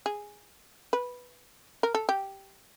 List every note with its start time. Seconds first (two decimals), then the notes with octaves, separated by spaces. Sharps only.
0.06 G#4
0.93 B4
1.83 A#4
1.95 A4
2.09 G4